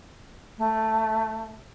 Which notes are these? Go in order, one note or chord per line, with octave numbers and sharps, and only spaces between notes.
A3